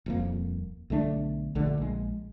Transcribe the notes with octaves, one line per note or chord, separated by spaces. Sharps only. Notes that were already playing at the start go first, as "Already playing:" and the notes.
D#1 F2 A#3
B1 D3 A3 D4
A#1 D3 A3
A#1 G#3